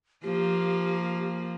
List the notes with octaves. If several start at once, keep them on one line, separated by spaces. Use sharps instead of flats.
F3 A#3 G4